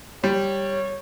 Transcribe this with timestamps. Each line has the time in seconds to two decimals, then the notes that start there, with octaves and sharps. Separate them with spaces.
0.24 G3 C#5